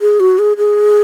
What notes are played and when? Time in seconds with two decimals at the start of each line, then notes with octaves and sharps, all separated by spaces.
0.01 G#4
0.20 F#4
0.39 G#4
0.57 G#4